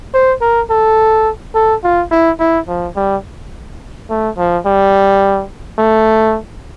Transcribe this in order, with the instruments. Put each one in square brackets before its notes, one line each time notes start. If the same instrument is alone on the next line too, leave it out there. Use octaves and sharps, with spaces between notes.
[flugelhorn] C5
A#4
A4
A4
F4
E4
E4
F3
G3
A3
F3
G3
A3